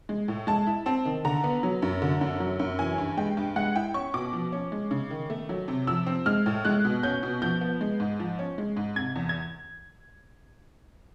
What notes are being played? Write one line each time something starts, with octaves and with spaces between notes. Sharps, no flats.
G#3
A2
G#3 A5
E4
C4 A5
D#3
D3 A#5
B3
F#3
F#2
D3
F#2
F#3
F#2
E3 G#5
G2
G#3 G5
G2
G#3 F#5
E4 G5
C#4 C#6
B2 D6
F3
C#4
G#3
C#3
D#3
A3
F#3
C3
F3 E6
C4
G#3 F6
A2
G#3 F#6
B2
C#4 G6
B2
F3 G6
B3
G#3
G#2
F3
C#4
G#3
G#2
C3 G#6
E2
G#6